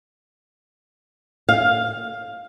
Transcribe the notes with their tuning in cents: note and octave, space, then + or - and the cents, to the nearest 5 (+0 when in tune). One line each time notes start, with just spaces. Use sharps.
F5 +10